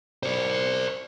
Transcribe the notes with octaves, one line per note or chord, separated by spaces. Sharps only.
C5 D5